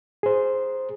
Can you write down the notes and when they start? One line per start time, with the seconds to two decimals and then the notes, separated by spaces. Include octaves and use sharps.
0.23 G#4 C5